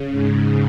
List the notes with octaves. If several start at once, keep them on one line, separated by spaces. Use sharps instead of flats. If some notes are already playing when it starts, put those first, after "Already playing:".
Already playing: C#3
G#2